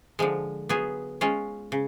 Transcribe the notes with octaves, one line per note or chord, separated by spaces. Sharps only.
D3 F3 G#3
F#3 B3 F4 G#4
G#3 C#4 F4
C#3